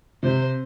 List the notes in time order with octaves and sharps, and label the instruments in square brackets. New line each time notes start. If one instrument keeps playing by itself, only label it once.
[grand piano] C3 [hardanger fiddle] C5